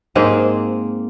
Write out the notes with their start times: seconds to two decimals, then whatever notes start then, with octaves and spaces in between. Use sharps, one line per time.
0.15 G#2 A#3 C4 G#4